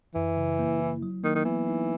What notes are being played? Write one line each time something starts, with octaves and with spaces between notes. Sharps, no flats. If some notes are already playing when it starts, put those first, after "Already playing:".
F#2 E3
C#3
A#3
E4
F#3
D#3 A#3
D#3
E3 B3
D#4